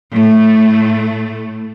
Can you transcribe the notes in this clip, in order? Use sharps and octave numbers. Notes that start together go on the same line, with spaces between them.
A2 A3